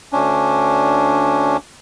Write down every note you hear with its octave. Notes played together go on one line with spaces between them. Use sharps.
D2 C#4 D4